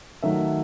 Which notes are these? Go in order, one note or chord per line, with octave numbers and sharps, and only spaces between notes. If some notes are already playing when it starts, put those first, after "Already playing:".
D#3 F#3 A3 E5